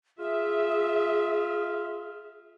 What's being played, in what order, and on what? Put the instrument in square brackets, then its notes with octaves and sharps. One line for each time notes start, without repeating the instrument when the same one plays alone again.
[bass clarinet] F4 [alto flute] G#4 [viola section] E5